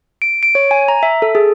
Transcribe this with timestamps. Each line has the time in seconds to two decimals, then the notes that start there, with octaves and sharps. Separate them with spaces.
0.22 D7
0.43 D7
0.55 C#5
0.71 G#5
0.88 A#5
1.03 E5
1.22 A4
1.35 G#4